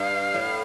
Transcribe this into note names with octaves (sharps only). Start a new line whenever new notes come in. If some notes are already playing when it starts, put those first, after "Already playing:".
Already playing: G2 F5
A2